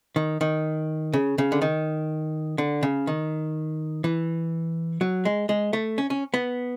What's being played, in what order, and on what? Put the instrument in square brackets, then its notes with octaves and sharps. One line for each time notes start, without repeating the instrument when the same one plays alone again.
[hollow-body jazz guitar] D#3
D#3
C#3
C#3
D3
D#3
D3
C#3
D#3
E3
F#3
G#3
G#3
A3
C#4
C#4
B3